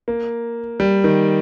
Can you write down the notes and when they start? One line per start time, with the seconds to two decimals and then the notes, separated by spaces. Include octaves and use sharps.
0.08 A#3
0.80 G3
1.04 D#3